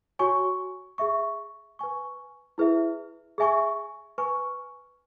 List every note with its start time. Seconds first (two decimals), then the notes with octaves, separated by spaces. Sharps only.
0.19 F#4 C#5 G#5 C#6
0.98 G#4 E5 C#6
1.79 B4 G#5 C#6
2.58 E4 G#4 B4 E5
3.38 G#4 E5 G#5 C#6
4.18 B4 G#5 C#6